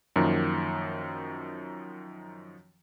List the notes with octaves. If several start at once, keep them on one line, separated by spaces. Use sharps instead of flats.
F#2 D#3 F3 A#3